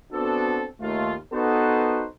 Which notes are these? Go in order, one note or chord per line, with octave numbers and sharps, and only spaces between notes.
B3 C4 D4 F#4 A4
D#2 A3 F4
B3 D#4 F#4 A4 B4 C5